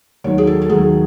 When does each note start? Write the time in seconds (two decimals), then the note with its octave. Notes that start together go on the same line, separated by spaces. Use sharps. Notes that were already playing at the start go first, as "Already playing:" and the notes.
0.24 D#2 D#3 F#3 C#5
0.38 G#4
0.47 A4
0.62 A4
0.69 D#2 D#3 F#3 G#4